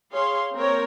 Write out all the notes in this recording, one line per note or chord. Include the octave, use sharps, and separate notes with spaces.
G#4 C#5 F5 C6
A#3 C4 A#4 C#5